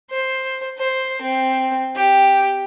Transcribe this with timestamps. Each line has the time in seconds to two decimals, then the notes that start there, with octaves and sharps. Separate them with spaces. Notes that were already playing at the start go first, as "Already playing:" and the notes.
0.11 C5
0.78 C5
1.22 C4
1.96 G4